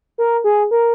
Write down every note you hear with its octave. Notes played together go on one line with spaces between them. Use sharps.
A#4
G#4
A#4